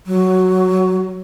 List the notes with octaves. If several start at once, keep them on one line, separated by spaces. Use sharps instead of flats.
F#3